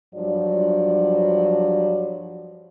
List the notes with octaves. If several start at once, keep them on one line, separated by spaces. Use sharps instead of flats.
G2 F3 F#3 D5